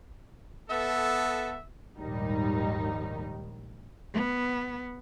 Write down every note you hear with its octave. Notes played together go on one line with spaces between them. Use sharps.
B3 A4 E5
A#1 D#2 G#2 D#3 G3 D#4
B3